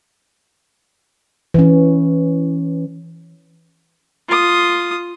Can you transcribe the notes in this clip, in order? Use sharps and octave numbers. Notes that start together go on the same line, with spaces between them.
E3 C#4
F4 D#6